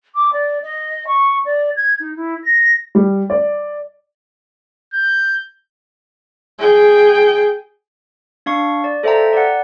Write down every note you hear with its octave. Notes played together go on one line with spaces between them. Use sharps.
D6
D5
D#5
C#6
D5
G#6
D#4
E4
A#6
G3
D5
G6
G#4 G5
D4 F5 C#6
D5
A4 C5 E5 F5 G5 A#5
D5 F#5